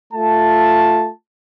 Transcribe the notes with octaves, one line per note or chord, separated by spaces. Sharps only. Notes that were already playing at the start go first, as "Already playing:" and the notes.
A3 F4 A5